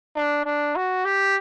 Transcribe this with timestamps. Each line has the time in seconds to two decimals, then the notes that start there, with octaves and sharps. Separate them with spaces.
0.16 D4
0.45 D4
0.75 F#4
1.05 G4